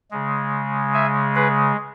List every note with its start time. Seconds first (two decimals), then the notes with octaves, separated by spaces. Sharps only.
0.11 C#3 G#3
0.94 E5 G#5
1.35 G#4 B4